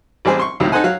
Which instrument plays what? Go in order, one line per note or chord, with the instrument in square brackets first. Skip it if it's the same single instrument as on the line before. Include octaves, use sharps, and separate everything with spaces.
[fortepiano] A1 G3 C4 G#4 C5
C6 C#6
C#2 A2 C3 D#3 F#3
D#4 A4 C5 F#5 G#5
F#3 F5 F#6